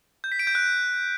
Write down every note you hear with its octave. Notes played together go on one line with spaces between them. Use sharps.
G6
B6
D7
G6
F#6